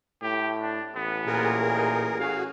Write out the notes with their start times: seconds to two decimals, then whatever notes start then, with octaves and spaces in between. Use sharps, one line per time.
0.22 A2 G4
0.60 D4
0.95 A1 B3
1.27 A#2 G#4 A#4
1.75 D#4
2.19 C#4 F#4 G#4 F5